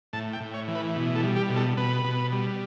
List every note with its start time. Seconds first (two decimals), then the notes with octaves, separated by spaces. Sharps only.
0.13 A2 A5
0.33 G5
0.40 A2
0.54 C#5
0.68 E3
0.75 B4
0.96 B2
1.15 A4
1.23 G3
1.36 G4
1.50 B2
1.56 A4
1.77 B2 B4
2.04 B2
2.32 G3